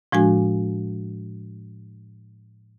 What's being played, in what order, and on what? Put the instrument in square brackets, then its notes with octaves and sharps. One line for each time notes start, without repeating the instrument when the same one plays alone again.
[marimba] A2 F3 G#3 D4 F#4 G#5